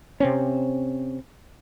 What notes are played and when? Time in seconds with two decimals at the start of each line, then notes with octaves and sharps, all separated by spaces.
0.20 C3 C4 C#4